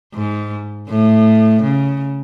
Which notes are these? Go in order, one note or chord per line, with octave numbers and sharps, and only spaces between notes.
G#2
A2
C#3